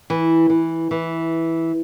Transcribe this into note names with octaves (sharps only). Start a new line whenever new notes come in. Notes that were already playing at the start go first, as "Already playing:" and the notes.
E3
E3
E3